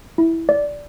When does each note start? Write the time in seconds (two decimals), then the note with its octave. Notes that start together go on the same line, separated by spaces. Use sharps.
0.18 E4
0.49 D5